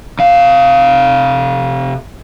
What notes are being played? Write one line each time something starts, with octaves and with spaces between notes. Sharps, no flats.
C3 F5